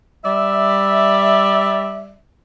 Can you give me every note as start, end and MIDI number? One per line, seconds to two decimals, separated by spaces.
0.24 2.15 55
0.24 2.15 74
0.24 2.15 76